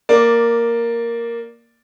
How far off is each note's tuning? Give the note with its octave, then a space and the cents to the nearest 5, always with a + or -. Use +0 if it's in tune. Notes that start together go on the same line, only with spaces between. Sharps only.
A#3 +0 D5 +0